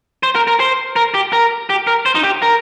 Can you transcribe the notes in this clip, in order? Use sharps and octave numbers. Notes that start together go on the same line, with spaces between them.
C5
A#4
A#4
C5
A#4
G4
A#4
G4
A#4
C5
D#4
G4
A#4